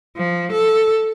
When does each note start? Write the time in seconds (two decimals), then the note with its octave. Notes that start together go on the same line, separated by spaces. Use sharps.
0.16 F3
0.52 A4